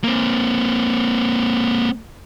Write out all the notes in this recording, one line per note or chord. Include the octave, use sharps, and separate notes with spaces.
A#3 C4